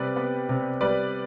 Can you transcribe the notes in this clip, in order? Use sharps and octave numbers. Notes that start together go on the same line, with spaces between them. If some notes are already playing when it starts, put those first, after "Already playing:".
Already playing: C3 G3 B4 D5
B3
C3
G3 B4 D5